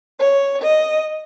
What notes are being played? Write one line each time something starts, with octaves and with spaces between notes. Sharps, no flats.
C#5
D#5